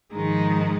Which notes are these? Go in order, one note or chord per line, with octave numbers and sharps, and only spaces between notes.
G#2 D#3 F3 G#3 D#4